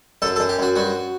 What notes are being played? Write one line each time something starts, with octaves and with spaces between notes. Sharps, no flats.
F#2 A4
A4
F#2
G4
F#2 F#4
G2 F#4